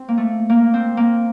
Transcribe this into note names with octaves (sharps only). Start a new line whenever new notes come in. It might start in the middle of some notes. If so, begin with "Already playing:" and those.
Already playing: C4
A#3
A3
A#3
C4
A#3